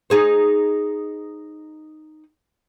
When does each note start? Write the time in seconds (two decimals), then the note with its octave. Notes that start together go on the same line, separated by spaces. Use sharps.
0.10 D#4 G#4 C5